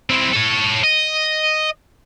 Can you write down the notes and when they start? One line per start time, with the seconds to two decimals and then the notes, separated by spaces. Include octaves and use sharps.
0.10 C4 E4
0.33 A4 C#5
0.84 D#5